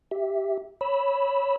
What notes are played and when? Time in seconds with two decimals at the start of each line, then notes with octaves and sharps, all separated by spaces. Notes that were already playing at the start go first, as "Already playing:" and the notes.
0.11 G4 E5
0.81 C#5 B5 E6